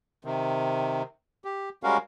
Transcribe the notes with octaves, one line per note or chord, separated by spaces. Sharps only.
C3 D#3
G4
G3 G#3 C#4 F#4 A#4 F5